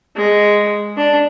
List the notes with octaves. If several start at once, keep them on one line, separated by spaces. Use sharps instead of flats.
G#3
D4